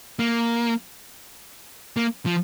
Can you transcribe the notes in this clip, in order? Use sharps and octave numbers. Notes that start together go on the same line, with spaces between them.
A#3
A#3
F3